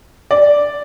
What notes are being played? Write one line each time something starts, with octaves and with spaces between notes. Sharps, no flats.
D5